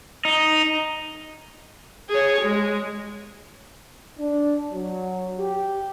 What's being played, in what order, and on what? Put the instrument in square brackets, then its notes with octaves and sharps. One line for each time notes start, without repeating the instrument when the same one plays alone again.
[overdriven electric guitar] D#4
[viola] G#4 C#5
G#3
[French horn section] D4
F#3
G4